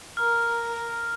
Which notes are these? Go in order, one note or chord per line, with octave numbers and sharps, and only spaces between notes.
A#4 F6